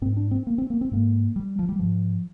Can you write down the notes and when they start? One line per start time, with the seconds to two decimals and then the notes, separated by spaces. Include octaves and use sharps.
0.02 G#2 C4
0.17 D4
0.31 C4
0.47 A#3
0.58 C4
0.70 A#3
0.81 C4
0.91 G#2 A#3
1.36 G3
1.59 F3
1.69 G3
1.79 G#2 F3